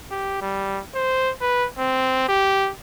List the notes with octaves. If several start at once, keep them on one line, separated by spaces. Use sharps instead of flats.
G4
G3
C5
B4
C4
G4